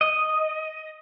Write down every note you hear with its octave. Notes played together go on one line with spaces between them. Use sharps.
D#5